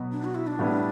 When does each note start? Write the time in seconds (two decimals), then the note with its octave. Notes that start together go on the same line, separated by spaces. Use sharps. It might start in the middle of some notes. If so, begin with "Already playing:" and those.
Already playing: B2 F#3 B3
0.12 D4
0.24 F#4
0.35 E4
0.47 D4
0.59 A2 G3 B3 E4